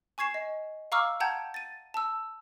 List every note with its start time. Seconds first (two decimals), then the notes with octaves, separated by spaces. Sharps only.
0.18 G#5 C#6 G#6 C7 E7
0.34 D#5
0.92 F5 A#5 C#6 D6 E6 F6
1.20 F#5 G5 A5 A#5 G6 G#6
1.54 A6 D#7
1.94 A5 E6